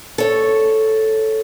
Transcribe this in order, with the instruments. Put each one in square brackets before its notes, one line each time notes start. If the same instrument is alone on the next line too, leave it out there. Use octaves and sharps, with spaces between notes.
[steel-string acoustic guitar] A4 C#5